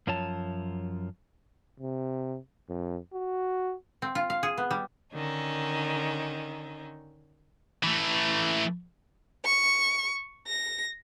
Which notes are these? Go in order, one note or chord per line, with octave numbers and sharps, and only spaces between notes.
F#2 F3 C#5 A5
C3
F2
F#4
C4
F4
F5
G#4
B3
G3
D3 D#3 C#4 D#4
E3 A3
C#6
A#6